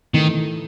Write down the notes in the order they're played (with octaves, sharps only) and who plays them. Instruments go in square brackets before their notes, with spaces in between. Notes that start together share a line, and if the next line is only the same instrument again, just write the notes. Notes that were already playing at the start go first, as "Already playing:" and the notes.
[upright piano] A2 E3 A3 D#4 [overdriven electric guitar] D#3